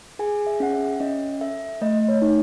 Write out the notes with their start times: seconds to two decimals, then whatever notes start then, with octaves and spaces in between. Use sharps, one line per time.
0.19 G#4 G#5
0.47 E5
0.60 C#4 F#5
0.74 E5
1.00 C#4 D#5
1.41 A4 E5
1.81 A3 D#5
2.08 C#5
2.22 D#4